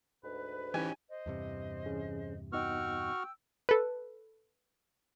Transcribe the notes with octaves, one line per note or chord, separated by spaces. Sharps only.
D2 G#2 B4
E3 C#4 D#4 G4 G#5
C5 D#5
E2 G2 C3
E3 C#4 G#4
B3 D#4 F#4 D#5 G5 C#6 E6 F6
A4 B4